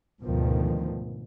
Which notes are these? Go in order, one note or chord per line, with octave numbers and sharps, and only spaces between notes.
D2 G#2 B2 D#3 F3